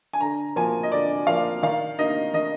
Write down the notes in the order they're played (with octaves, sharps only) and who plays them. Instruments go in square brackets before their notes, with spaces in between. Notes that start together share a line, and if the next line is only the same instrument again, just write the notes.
[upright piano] G#5
D3 A#5
F3 A#3 G#5
D#5
D3 D5
F3 A#3 F5
D#3 F5
A#3 D#4 D#5
D#3 D#5